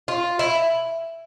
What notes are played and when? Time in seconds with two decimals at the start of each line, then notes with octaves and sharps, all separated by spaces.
0.08 F4
0.39 E4